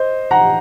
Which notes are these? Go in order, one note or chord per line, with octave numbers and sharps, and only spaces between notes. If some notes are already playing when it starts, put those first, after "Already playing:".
Already playing: C5 D#5
F#5 A#5